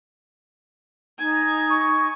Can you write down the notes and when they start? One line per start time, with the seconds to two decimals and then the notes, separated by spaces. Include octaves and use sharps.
1.19 D#4 G#5
1.70 C#6